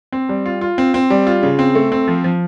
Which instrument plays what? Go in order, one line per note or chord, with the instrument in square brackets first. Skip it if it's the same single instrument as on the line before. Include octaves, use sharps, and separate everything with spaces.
[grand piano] C4
G3
F4
F4
C4
C4
G3
F4
C#3
C4
A3
C4
F3
F3